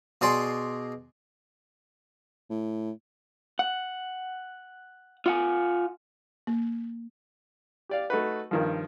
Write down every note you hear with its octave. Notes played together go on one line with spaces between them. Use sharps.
B2 G#4 D5 C6
A2
F#5
F4 F#5 G#5
A#3
G4 D5 F5
A3 D#4 F#4 B4
G2 D#3 F3